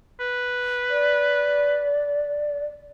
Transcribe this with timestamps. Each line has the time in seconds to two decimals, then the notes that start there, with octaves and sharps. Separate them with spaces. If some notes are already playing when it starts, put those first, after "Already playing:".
0.20 B4
0.90 D5